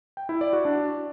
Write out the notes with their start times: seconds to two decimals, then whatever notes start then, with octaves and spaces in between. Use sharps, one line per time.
0.17 G5
0.29 E4
0.41 D5
0.53 F#4
0.65 D4